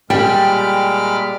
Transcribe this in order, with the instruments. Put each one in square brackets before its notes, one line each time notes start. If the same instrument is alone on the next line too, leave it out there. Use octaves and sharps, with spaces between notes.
[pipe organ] A#2 B5 D6 [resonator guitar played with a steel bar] G3 [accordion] G#3 F6 [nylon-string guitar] G5